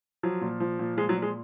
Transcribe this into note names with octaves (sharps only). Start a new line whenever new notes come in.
F3 F#3
A#2
F3
A#2
F3 G#3
F#3
A#2
G#3